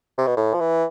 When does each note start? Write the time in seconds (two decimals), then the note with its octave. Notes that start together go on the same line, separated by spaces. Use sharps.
0.18 C3
0.27 B2
0.37 A2
0.54 F3
0.61 E3